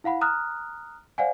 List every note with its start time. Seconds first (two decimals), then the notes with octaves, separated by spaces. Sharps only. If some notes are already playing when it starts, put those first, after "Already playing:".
0.04 E4 F5 F#5 B5
0.21 A#5 D#6 F6 F#6
1.18 C5 D5 F5 F#5 G#5